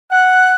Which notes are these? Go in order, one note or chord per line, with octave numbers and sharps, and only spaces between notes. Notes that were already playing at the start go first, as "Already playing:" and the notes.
F#5 F#6